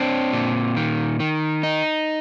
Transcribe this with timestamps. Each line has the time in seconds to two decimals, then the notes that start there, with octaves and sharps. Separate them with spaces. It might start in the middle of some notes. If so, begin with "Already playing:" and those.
Already playing: C4 D4
0.33 A#2
0.77 D#3
1.20 D#3
1.63 D#4